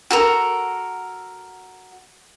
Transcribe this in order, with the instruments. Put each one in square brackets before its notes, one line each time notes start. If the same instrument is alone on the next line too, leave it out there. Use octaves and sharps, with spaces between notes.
[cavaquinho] F#4 A4 A#4